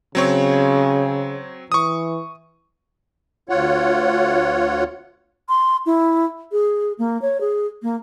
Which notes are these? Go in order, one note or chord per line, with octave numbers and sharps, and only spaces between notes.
C#3 F#3 C4 C#5
E3 C#6 D#6
D2 F4 C#5 F#5
C6
E4
G#4
A#3
C#5
G#4
A#3